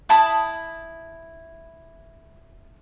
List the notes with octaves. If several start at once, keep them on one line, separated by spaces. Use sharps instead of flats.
E4 A5 B5 D#6